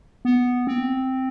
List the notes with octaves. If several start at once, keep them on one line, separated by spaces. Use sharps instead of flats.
B3
C4